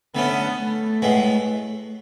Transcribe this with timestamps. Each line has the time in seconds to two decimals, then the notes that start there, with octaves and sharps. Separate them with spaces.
0.15 D3 A3 B3 C#4
0.59 A3
1.02 A2 G#3 B3